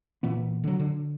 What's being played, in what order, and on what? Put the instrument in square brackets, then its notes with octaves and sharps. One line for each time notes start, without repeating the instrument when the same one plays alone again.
[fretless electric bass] A#2 E3 B3
D3 F#3
D3